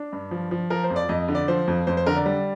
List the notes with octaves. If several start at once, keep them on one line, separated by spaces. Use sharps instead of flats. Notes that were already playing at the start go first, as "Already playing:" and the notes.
Already playing: D4
G2
F3
F3
F3 A#4
C5
F2
D5
F2 D#5
D3
D5
F3 C5
F2
F2 C5
C5
D3 A#4
D5
G3